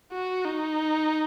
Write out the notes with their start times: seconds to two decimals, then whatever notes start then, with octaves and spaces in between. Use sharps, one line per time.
0.13 F#4
0.45 D#4